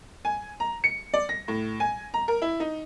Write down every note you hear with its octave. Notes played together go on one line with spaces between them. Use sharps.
G#5
A#5
C#7
D5
A#6
A2
G#5
A#5
A#4
E4
D#4